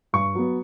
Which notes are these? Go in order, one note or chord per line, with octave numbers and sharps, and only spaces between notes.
G2 C#6
F#3 B3